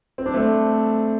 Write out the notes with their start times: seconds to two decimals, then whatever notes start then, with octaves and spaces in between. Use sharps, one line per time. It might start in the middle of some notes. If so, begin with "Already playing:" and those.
0.18 C4
0.26 D4
0.34 A3 C4